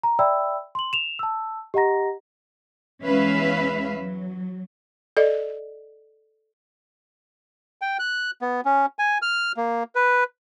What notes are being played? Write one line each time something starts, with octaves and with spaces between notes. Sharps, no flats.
A#5
D5 E5 G5 B5 E6
C6 F#7
E7 F7
A5 E6
G4 D#5 F#5 A#5 A#6
E2 G#3 C#4 B4 E5 F5
F#3
A4 D5 D#5
G5
F#6
B3
C#4
G#5
F6
A#3
B4